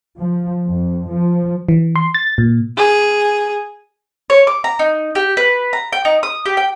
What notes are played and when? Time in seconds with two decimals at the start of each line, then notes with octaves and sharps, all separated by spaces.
0.18 F3
0.68 F2
1.11 F3
1.69 E3
1.96 C6
2.14 A6
2.38 A#2
2.78 G#4
4.30 C#5
4.47 D6
4.64 A#5
4.79 D#4
5.15 G4
5.37 B4
5.73 A#5
5.93 G5
6.05 D#4
6.23 D#6
6.46 G4
6.57 G5